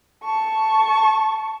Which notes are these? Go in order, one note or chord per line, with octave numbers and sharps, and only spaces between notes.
A5 C#6